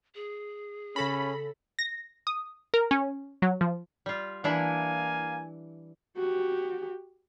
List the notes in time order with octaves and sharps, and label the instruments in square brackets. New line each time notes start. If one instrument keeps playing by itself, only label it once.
[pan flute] G#4
[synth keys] C#3 A4 A#6 [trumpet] C#4 [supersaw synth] B5
[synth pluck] A#6
D#6
A#4
C#4
F#3
F3
[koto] G3 F4
[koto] E3 D4 E4 [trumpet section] A#3 F5 G#5
[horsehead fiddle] F#4 G4